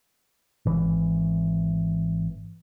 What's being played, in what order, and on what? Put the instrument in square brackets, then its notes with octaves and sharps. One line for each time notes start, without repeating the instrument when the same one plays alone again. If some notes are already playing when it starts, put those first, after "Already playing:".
[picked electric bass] G#1 E3